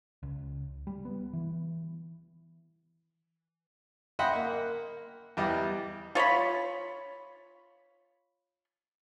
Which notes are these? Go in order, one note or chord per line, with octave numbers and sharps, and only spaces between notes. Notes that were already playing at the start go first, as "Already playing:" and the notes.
C#2
G3
B3
E3
D#5 E5 F#5 G5 B5 C6
A#3
E2 G3 G4 D#5
F4 C#5 A#5 B5